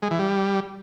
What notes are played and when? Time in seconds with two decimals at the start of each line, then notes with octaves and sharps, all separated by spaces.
0.02 G#3
0.11 E3
0.19 G3